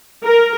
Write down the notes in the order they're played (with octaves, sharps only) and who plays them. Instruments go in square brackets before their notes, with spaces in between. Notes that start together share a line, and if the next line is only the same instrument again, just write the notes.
[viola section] A#4